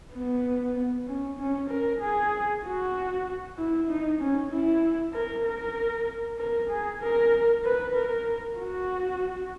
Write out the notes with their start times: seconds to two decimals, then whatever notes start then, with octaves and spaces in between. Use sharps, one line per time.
0.13 B3
1.08 C#4
1.39 C#4
1.70 A#4
2.01 G#4
2.65 F#4
3.58 E4
3.89 D#4
4.21 C#4
4.51 E4
5.14 A#4
5.45 A#4
6.39 A#4
6.70 G#4
7.02 A#4
7.64 B4
7.95 A#4
8.58 F#4